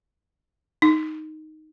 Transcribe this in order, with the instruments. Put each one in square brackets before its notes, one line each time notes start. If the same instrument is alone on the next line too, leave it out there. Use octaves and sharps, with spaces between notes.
[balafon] D#4